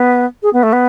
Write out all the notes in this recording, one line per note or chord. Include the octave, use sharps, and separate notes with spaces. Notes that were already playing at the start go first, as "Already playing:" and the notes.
Already playing: B3
G#4
B3
A3
B3